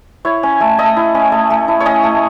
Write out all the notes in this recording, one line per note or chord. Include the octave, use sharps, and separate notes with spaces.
E4 C#5
C#4
A3
A3 D#5
E4
C#4
A3
A3
E4
C#5
C#4 D#5
A3